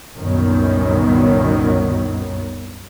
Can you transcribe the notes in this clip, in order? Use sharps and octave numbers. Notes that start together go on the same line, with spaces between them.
C2 F#2 A#2 D#3 F#3 B3